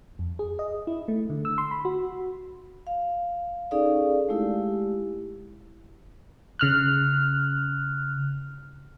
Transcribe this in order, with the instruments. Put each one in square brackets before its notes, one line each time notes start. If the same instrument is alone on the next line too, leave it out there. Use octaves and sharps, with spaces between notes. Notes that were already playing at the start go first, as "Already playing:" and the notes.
[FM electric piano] F2
G#4
D#5
E4
A3
D3
E6
C6
B5
F#4
[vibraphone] F5
C#4 D#4 G#4 A4 D5 F5
G#3 A3 E4 G4
[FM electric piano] C#3 F6 F#6